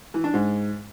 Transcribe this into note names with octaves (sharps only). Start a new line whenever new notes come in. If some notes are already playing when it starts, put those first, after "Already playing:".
E3
D4
G#2